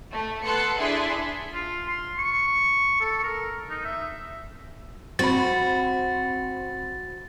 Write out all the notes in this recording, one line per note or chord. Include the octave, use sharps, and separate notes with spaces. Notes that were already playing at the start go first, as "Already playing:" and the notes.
A3
B3 A4 C6 F#6 C#7
D4 E4 G#4 E5 C6
F4
C6
C#6
A4
A#4
D#4
E5
C4 F#4 B5 A6